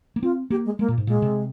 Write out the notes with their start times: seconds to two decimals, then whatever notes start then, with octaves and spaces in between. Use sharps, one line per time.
0.16 A#3
0.23 C4 F4
0.50 A#3 G4
0.65 G#3
0.79 G#3 A#3
0.88 A#2
0.98 G#2
1.07 A#2 G#3
1.22 C3